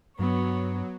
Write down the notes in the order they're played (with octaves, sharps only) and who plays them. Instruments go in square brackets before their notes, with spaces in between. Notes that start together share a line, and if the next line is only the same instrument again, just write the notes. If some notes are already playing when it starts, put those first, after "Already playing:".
[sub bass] G2 [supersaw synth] F#3 [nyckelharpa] B3 C#5